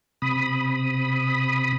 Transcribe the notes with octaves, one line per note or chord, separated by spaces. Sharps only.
C3 B5 D#6